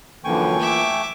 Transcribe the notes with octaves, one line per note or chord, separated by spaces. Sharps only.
F#2 D3 E3 F3 A#3 G5 G#5 C#6
A3 E5 D6